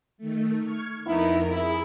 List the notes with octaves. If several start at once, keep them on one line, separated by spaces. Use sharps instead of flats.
D#3 A3
C#6 F6 G#6
F2 B3 D#4 E4 A#4
E4 G#4